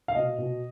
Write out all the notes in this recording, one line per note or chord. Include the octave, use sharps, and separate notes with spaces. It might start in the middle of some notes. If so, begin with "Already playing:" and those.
F5
B2 D#5
B2